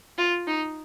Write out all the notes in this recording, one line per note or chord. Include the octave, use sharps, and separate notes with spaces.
F4
D#4